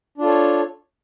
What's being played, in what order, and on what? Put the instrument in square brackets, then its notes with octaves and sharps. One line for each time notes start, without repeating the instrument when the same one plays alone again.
[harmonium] D4
F4
A4
C#5